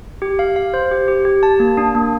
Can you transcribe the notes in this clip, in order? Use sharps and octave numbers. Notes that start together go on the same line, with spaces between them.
G4
F5
F5
C5
G4
G4
G4
A5
A#3
D4
A#3